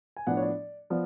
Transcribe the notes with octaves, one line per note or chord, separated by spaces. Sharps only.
G#5
A2 F3 B3 D4 F#5
C#5
D5
F3 B3 D5